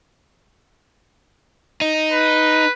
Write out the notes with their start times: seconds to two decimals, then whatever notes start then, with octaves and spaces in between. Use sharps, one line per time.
1.81 D#4
2.12 B4